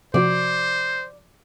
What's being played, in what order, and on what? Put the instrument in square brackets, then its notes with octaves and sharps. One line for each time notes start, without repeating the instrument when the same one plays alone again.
[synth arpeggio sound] C3 F3 F#4 [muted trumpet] C5 [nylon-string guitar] D5